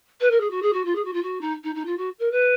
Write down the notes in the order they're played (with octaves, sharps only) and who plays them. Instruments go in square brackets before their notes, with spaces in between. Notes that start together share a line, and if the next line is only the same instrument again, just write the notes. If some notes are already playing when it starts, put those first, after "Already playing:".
[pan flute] B4
A#4
G#4
F#4
G#4
F#4
F4
G#4
F#4
F4
F#4
D#4
D#4
D#4
F4
F#4
A#4
B4